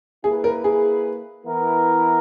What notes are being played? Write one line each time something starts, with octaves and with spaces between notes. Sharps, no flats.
A#3 E4 G#4 B4
A#4
G#4
E3 B3 E4 A#4